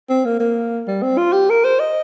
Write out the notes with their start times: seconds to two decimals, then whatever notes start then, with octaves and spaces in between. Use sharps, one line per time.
0.10 C4
0.25 A#3
0.40 A#3
0.88 G3
1.03 C4
1.18 F4
1.33 G4
1.50 A#4
1.64 C5
1.80 D#5